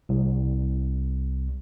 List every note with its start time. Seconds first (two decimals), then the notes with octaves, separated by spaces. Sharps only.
0.09 C2